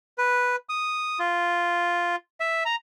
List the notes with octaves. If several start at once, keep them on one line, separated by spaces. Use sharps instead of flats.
B4
D#6
F4
E5
A#5